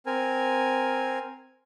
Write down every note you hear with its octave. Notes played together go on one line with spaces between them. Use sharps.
C4 A#4 G#5